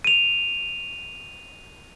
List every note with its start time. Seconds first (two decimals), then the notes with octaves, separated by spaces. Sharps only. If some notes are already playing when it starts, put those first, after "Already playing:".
0.04 D#7 F7